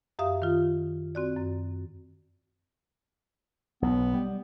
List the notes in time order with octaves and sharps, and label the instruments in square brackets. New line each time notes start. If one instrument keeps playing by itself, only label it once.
[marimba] F#2 G4 E5 F5 D#6
D#3 F4
C4 F#4 D5
F#2
[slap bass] B1 [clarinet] B3
[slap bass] G3